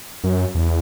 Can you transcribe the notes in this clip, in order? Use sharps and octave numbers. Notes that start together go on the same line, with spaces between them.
F#2
E2